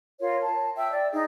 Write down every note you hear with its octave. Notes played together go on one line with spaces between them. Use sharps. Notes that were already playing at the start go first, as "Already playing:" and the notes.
F4 A#4 C#5
A5
E5 G5 E6
D5
D#4 G#4 D#5